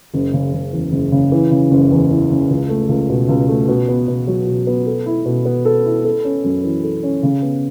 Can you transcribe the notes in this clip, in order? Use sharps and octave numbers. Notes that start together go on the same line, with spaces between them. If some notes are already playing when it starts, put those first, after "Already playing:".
F#1
C#3
F#1
E2
F#1
C#3
E3
C#3
F#1
E2
E3
C#3
C#2
A3
C#2
B2
C#2
A3
B2
B3
B2
F#3
B2
B3
A4
E4
B2
B3
A4
E4
A4
C#4
F#2
E3
A4
C#4
C#3
B3